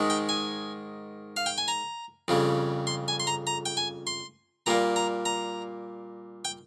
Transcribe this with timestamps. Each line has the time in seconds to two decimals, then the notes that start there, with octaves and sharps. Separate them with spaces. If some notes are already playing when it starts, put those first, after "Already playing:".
Already playing: G#2 D#3 G#3
0.10 G5
0.29 G#5
1.37 F5
1.46 G5
1.58 G#5
1.68 A#5
2.28 F2 C#3 G3
2.87 C6
3.08 G#5
3.20 C6
3.27 A#5
3.47 A#5
3.66 G5
3.77 G#5
4.07 C6
4.66 A#2 G3 A#3 A#5
4.96 A#5
5.25 A#5
6.45 G5